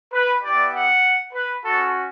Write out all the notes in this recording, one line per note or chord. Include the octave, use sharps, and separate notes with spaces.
B4
B3 E4 G4 D5
F#5
B4
C#4 F#4 A4